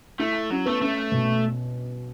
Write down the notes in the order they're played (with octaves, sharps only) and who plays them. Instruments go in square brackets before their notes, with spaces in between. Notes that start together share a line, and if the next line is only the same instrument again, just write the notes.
[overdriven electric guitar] A3 [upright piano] E4
[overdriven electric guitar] F#3 [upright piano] C#4
[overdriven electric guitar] A3 [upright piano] B3
[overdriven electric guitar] A3 [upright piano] C#4
[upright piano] B2